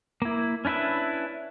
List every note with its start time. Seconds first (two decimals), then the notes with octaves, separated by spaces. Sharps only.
0.22 A#3 E4
0.65 C#4 D4 E4 B4 E5